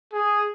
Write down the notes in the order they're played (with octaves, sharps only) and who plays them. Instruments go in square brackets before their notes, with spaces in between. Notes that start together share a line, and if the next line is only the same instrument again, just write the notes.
[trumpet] G#4